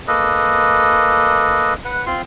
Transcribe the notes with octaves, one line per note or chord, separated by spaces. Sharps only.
A#3 A4 B4 D#5
B4 F#5
C4 F4 C6